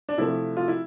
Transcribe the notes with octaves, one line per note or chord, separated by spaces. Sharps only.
D4
C3 F3 A3 E4
F4
E4